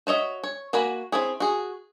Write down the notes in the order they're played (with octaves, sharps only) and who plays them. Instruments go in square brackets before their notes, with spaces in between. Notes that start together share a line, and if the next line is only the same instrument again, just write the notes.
[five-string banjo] F#4 C#5 D#5 E5
C#5
A#3 F#4 F#5 G#5 B5
C4 C#4 E4 G#4
F#4 G#4